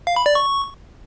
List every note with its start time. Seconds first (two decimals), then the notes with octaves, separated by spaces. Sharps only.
0.07 F5
0.16 B5
0.26 D5
0.35 C#6